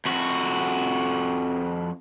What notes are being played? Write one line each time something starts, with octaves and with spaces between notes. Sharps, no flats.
F2 F#4